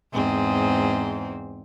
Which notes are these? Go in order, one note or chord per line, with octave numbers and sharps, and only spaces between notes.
E2 G#2 C4